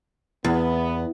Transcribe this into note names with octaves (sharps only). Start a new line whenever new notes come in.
E2 B3